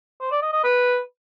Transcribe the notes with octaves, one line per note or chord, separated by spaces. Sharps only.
C5
D5
D#5
D#5
B4